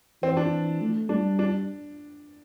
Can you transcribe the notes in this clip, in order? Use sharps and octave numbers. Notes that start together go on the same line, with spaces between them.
E3 C4
D4
A3
G3 D4
D4